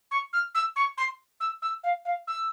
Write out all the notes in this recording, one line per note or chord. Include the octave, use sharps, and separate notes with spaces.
C#6
F6
E6
C#6
C6
E6
E6
F5
F5
E6